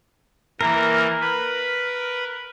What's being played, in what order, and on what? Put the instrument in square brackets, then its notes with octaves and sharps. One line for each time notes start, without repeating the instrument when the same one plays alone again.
[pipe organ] E3 A#3 [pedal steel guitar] A#4
[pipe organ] B4